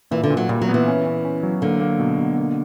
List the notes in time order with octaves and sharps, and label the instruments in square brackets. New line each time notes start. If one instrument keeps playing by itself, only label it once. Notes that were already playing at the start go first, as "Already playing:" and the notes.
[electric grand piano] A#2 [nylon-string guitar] E3
[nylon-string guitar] D3
[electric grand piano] A#2
[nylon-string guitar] F#3
[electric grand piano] A#2 [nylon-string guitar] G3
[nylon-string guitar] F#3
[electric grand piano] B3
[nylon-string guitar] E3
[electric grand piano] C#4
C#4
C#4
F#3
[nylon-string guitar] D3 [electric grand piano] A#3
[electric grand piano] A#3
B2
B2
A#3